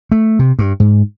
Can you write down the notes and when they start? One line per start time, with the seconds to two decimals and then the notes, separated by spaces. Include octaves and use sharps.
0.12 A3
0.39 C3
0.59 G2
0.80 G#2